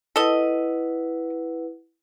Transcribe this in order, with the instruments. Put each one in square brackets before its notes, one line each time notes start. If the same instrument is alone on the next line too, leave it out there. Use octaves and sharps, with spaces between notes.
[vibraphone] E4 B4 F#5 [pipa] A4 D#5